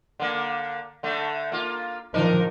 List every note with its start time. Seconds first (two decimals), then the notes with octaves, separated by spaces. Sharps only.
0.20 D3 A#3
1.03 D3 A3
1.52 A#3 F4
2.14 D#3 F3 D4 D#4 A#4